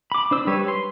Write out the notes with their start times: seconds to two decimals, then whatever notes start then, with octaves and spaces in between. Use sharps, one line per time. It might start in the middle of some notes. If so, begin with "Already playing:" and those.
0.12 B5 D6
0.31 D4 C5 E6
0.47 G3 B4 C#5
0.68 C6